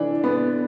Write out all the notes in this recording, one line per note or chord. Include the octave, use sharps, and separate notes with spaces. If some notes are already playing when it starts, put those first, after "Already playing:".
Already playing: E3 D4
B3